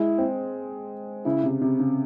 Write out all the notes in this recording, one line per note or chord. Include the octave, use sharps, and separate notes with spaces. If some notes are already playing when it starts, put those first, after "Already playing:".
Already playing: G#3 E4
C4
C#3 E4
C3
C3
C#3